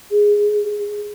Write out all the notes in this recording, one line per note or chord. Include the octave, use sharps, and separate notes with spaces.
G#4